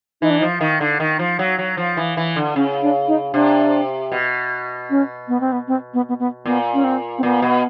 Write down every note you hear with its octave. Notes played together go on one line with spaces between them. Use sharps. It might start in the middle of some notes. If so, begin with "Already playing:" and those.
E3 D#4
D4
D#4
F3
D#3
D3
D#3
F3
F#3
F#3
F3
E3
E3
D3
C#3 C#4
D4
D#4
C3 D4
B2
C#4
B3
C4
B3
C4
B3
B3
B3
A#2 B3
C#4
C4
C4
A#2 B3
B2